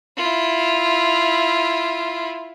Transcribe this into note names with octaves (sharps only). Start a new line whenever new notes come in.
E4 F4